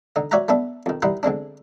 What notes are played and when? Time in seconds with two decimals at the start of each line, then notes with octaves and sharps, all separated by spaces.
0.16 D3 D#4
0.31 F#4 C#5 D5 E5 F#5 A#5
0.48 A3 B3 D4 A4
0.86 F2 D#3
1.02 D#3 G3 D#4 E4 F#5 C6
1.23 D3 G#3 C4 D4